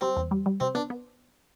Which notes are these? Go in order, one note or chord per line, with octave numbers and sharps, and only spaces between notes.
G3 C4
E2
G3
G3
C3 C4
B3 D4
B3